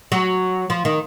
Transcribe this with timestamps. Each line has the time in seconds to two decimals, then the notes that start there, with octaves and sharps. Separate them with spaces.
0.12 F#3
0.70 F3
0.85 D#3